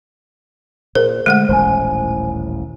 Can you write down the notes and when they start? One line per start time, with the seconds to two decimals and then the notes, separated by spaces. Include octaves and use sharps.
0.95 A#2 G#4 A#4 C5
1.26 D3 G#3 A3 F#5
1.49 D#1 A1 A2 C5 G#5